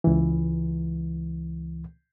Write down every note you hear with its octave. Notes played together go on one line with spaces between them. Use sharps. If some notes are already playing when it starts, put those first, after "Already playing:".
C#2 E3